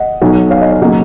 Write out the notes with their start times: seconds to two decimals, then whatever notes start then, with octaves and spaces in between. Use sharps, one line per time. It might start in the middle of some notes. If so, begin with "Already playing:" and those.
Already playing: D#5 F#5
0.22 B1 B2 F#3
0.50 C#5 F5
0.61 D#5
0.71 C#5
0.81 C#3 F#3 A#3 D#5